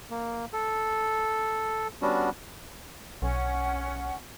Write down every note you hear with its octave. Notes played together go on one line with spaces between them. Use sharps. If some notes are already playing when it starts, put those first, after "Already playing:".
A#3
A4
G3 B3 C#4 D4 F#4
B1 C#4 F#5